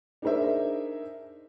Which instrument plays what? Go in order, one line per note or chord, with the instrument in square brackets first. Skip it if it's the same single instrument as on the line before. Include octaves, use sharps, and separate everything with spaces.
[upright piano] D4 D#4 G#4 A#4 C5 E5